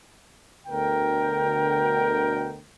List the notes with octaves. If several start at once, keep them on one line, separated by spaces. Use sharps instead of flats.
D2 B2 D3 A#4 G5